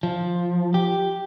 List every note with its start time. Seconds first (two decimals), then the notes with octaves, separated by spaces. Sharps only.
0.03 F3
0.74 G4